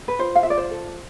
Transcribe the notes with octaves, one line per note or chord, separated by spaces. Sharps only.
B4
F4 C5
F5
F4 E5
D5
C5
A4